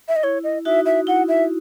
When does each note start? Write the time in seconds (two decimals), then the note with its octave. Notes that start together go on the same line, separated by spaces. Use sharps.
0.08 E5
0.16 D#5
0.23 E4 C#5
0.44 D#5
0.65 D#4 F#4 E5
0.86 E5
1.07 E4 F#5
1.28 E5